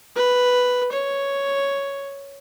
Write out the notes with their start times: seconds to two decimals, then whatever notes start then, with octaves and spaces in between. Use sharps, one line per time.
0.16 B4
0.92 C#5